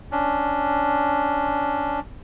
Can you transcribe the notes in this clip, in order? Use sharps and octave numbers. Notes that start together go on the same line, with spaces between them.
C#4 D4